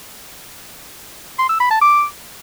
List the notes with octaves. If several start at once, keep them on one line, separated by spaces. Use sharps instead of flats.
C6
E6
B5
A5
D6